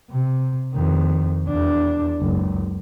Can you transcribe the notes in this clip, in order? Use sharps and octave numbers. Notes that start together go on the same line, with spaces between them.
C3
F2 D#3
E2 D4
F#1 C#2